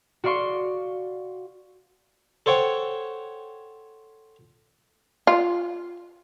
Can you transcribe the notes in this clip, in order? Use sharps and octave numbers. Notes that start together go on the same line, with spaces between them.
F#4 D5 F5 C6 C#6
A4 C5 C#5 F#5 G5
F4